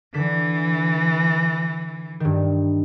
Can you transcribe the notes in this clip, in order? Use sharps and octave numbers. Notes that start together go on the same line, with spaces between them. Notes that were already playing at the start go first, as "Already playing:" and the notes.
D3 E3 B6 E7
G2 D#3